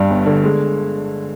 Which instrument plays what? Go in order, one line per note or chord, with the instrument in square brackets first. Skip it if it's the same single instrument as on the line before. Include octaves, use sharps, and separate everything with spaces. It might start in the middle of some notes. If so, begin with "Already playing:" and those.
Already playing: [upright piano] G2 G3
G1
D3
G#3